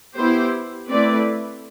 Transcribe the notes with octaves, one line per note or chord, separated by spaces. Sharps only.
B3 E4 G4 C5
A3 C4 E4 B4 D5